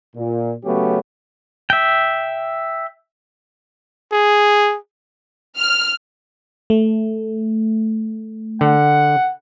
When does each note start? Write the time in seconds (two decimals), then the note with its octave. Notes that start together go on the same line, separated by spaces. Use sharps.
0.16 A#2
0.65 C#3 F#3 A3 B3 C#4 G4
1.70 E5 G5
4.12 G#4
5.57 F6
6.70 A3
8.61 D3 F#5